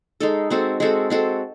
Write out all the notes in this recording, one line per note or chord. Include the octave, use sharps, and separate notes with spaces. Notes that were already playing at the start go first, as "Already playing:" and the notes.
G#3 D#4 A4
G#3 C4 F#4 A4
G#3 C4 F#4 A4
G#3 C4 F#4 A4